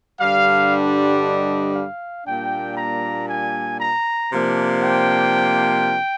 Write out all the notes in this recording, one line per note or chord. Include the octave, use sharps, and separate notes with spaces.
G2 D3 G3 D4 F5
D#5
F5
A#2 G3 A#3 D4 G5
A#5
G#5
A#5
C3 F3 A#3 D4
G5